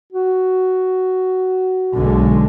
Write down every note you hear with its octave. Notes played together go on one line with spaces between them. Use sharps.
F#4
B1 D3 G#3